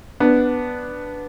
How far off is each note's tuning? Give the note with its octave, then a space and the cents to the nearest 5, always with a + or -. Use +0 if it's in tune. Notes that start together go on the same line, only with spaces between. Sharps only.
B3 +0 D4 +0